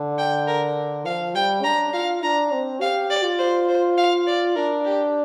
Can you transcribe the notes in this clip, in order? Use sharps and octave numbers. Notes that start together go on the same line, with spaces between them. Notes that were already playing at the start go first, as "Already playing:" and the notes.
Already playing: D3
G5
A#4
F3 F5
G3 G5
D4 A#5
F4 F5
D4 A#5
C4
G4 F5
D5
F4
C5
C5
F5
D5
D4 A#4
G4